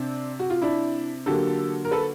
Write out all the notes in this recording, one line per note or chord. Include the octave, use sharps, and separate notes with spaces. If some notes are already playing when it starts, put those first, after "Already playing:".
Already playing: C3 C4 D4
F#4
F4
D4 E4
D3 F#3 A#3 G4 A4
A#4
A4 B4